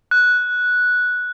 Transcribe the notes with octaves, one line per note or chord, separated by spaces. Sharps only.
F#6